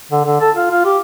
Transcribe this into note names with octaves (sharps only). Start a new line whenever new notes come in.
D3
D3
A4
F4
F4
G4